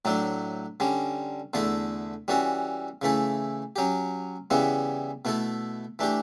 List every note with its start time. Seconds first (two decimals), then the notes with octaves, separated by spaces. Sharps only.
0.05 A2 F#3 A3 D4
0.80 D3 G3 C#4
1.53 E2 D3 A3 E4 A4
2.28 E3 G3 C#4 F#4 A4
3.02 C#3 E3 A3 E4 A4
3.76 F#3 C#4 G4
4.50 C#3 E3 G3 B3 E4
5.25 B2 A3 E4 A4
5.99 E3 A3 D4 G4